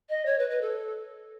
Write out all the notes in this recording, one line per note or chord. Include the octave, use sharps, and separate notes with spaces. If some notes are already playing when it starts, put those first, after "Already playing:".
D#5
C#5
B4
B4
A4